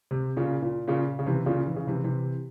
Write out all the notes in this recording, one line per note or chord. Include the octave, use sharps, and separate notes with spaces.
C3
A#2 C#3
A#2
A#2 C#3
C#3
C3 E3
A#2 C#3
E3
C#3
C3 E3
C3 E3